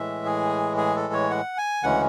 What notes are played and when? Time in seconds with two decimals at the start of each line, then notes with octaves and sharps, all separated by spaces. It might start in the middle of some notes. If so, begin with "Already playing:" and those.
Already playing: A2 E3 G#3 E5
0.25 G#4
0.77 G#4
0.96 A4
1.13 C#5
1.30 F#5
1.57 G#5
1.83 D2 C#3 E3 G#3 C#4 F#5